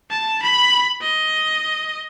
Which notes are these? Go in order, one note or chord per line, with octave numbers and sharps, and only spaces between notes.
A5
B5
D#5